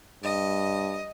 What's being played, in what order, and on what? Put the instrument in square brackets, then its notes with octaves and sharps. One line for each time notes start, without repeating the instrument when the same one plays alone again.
[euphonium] G2 [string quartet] D#5